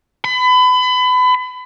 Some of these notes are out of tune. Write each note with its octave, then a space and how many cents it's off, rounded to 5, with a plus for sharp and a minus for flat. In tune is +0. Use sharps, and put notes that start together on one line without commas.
B5 +30